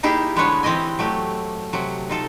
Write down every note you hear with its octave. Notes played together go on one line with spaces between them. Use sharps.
A#3 D#4 E4 G4 G#4 F5
D3 G#3 A3 B3 B4 C#5
E3 C4 G4 D#5 G#5
F#3 A3 G4
C3 F#3
D#4 F4 A4